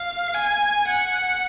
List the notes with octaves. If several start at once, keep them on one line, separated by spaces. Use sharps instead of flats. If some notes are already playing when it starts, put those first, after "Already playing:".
Already playing: F5
G#5
F#5